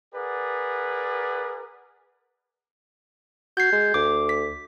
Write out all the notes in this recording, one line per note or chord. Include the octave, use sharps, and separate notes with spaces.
G#4 A#4 B4 D5 F#5
F#4 G6 G#6 C7
G#3
D2 D6
B6